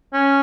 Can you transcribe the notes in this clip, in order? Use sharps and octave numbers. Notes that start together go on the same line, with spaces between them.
C#4